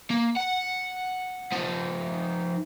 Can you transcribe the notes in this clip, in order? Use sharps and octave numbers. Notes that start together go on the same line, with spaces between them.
A#3
F#5
F3 D#4